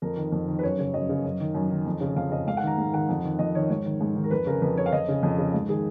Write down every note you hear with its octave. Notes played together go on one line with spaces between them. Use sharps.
F2 A#4
D#3
F2
D#3
B4
F#2 C#5
C#3 C#5
F#2 D#5
C#3
F#2
D#3
F#2
D#3
F2
C#3
F2 F5
C#3 D#5
G#2 F5
F#5
D#3 A#5
G#2
D#3 F#5
F2
D#3
F2 D#5
D#3 C#5
G#2 C#5
D#3
G#2
D#3
A#4
F2 B4
C#3 A#4
F2 B4
C#3 C#5
F5
F2 D#5
C#3
F2
C#3
G#2
D#3 G#4